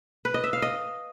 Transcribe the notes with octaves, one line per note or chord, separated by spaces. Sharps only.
B4
D#5
E5
F5
D#5